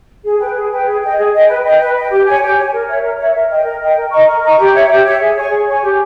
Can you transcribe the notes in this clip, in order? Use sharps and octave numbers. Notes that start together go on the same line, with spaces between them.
G#4
B4 G5
G#4
B4 G5
G#4
D#5 G5
G#4
D#5 G5
B4
D#5 G5
B4
D#5 G5
G4
C#5 G#5
G4
C#5 G#5
A#4
C#5 E5
A#4
C#5 E5
A#4
D#5 G5
A#4
D#5 G5
A#4
D#5 A#5 C#6
A#4
D#5 A#5 C#6
G4
C#5 E5
G4
C#5 E5
G#4
C#5 G#5 C#6
G#4
C#5 G#5 C#6
G4